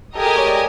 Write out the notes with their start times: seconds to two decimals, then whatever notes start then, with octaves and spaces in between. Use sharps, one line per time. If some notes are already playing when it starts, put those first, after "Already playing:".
0.15 G4 A4 A#4 D#5 G#5
0.25 G#4
0.36 C#5
0.46 D5